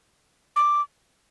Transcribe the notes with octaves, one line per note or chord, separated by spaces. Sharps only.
D6